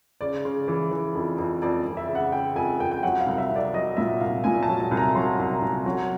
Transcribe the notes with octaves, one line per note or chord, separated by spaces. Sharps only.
C#3 D5
C#3
E3
E3
F2
F2
F2 D5
F2
E5
C#3
F#5
C#3 G5
F2 G#5
F2 G5
G5
F#3 F#5
F5
C2
E5
C2
D5
F#3 D#5
A#2 E5
C2 F5
A#2 G#5
A5
F#3
A5
C2
A#5
F#3 C6
C2
C2
F#3